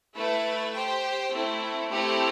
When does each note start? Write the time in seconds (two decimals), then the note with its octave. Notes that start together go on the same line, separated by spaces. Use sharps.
0.13 A3 E4 B4 E5
0.72 G4 C5 G5
1.31 A3 C4 E4
1.91 A3 C4 E4 G4